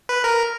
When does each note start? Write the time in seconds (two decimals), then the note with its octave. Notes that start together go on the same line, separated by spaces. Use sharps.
0.09 B4
0.24 A#4